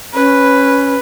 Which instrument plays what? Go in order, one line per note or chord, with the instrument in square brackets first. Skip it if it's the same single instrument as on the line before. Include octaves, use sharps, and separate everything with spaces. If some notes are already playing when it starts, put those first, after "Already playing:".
[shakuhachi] C#4 [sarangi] B4